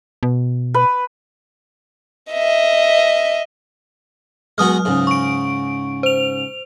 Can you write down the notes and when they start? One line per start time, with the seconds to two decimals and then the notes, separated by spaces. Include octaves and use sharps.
0.23 B2
0.74 B4
2.31 D#5 E5
4.58 F#3 G#3 B3 F#4 D#6 F6
4.85 C#2 G#2
5.07 C#6 D7
6.03 C5 F7